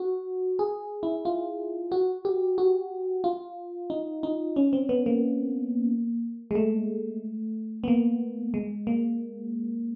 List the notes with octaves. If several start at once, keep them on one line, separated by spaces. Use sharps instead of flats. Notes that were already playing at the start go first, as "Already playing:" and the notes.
Already playing: F#4
G#4
E4
F4
F#4
G4
F#4
F4
D#4
D#4
C#4
C4
B3
A#3
G#3
A3
B3
A#3
G#3
A#3